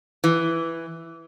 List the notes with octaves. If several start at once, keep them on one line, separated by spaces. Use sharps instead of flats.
E3